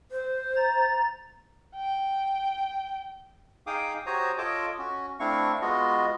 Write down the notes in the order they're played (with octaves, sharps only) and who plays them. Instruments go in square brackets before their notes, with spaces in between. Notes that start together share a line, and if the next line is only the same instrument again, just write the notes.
[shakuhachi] C5
[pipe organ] A#5 A6
[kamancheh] G5
[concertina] D#4 G#4 F5 G5 D6 D#6
F#4 G4 C5 C#5 A#5 D#6
F4 A4 C#5 D#5 A5 D6
C#4 F#4
A3 C4 D4 E4 F5 C#6
G#3 B3 F4 F#4 D#5